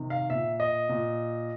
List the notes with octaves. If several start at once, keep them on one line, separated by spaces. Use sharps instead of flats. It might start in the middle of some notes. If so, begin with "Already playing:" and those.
Already playing: C3 D#3
F5
A#2 E5
D#5
A#2